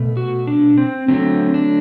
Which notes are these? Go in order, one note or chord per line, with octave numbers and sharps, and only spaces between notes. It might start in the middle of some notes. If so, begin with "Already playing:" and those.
Already playing: B2 A3
F#4
D4
C4
D3 F#3 A3 C4
D4